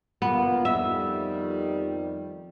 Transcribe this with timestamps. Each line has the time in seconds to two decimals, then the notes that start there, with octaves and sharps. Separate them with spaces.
0.22 G1 A#3 B3 F4
0.65 F2 D#3 G3 E5